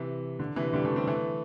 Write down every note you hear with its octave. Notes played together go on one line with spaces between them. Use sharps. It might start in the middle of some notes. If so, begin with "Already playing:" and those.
Already playing: C3 E3
D3
C3 E3
D3 G3
E3 A3
G3 C4
E3 A3